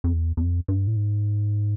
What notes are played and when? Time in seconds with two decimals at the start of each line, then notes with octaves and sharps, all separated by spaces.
0.04 F2
0.13 E2
0.37 E2
0.41 F2
0.68 G2
0.87 A2
0.96 G#2